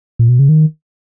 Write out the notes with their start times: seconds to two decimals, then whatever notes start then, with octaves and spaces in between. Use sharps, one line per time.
0.19 A#2
0.29 B2
0.39 C#3
0.49 D#3